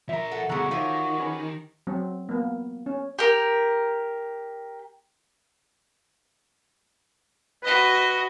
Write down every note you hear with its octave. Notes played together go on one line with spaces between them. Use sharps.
F3 A#4 E5 A#5
A4 F#5
D2 B2 G#3 F#4 A4 F#5 A#5
D#3 F3 G4 A#4 C#5 E5 F5
C#4 G#4 B4
F#3 C4
A#3 B3
C#4
G4 A#4
F#4 B4 D#5